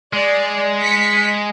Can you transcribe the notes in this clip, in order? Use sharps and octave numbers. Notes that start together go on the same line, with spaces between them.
G#3 D5
B6 C#7